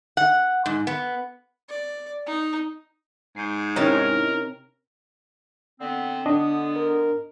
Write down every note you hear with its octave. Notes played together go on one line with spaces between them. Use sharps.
F#5
G#2
B3
D5
D#4
G#2 G6 C7
C3 C#4 D#4 E4 A#4 A5
D3 B3 C4
D3 B3 D4 D#5
A#4